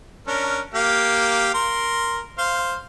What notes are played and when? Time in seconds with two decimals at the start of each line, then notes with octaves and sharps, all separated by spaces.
0.27 C#4 D4 A#4
0.74 A#3 G4 F5
1.54 A#4 C6
2.38 C5 F5 C6